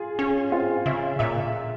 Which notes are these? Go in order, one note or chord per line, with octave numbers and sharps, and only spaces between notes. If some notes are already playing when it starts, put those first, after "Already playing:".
Already playing: F4 G#4
C#4 G#4
C4 F4
C#3 E5
A#2 E5